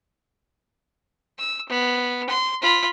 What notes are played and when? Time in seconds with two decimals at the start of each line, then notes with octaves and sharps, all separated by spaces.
1.38 E6
1.69 B3
2.29 C6
2.62 F4 B5